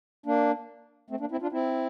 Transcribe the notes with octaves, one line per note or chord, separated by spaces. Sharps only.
A#3 D4
A3 C4
A#3 D4
C4 E4
D4 F4
C4 E4